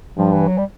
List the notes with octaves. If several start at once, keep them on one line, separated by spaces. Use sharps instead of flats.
G2 F3
E3
F#3
G3